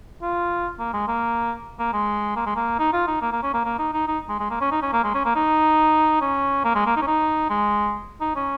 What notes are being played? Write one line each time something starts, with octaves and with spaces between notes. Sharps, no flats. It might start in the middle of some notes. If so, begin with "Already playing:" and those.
F4
A#3
G#3
A#3
A#3
G#3
A#3
G#3
A#3
D#4
F4
D#4
A#3
A#3
C#4
A#3
A#3
D#4
D#4
D#4
G#3
G#3
A#3
C#4
D#4
C#4
A#3
G#3
C#4
A#3
D#4
C#4
A#3
G#3
A#3
D#4
C#4
D#4
G#3
D#4
C#4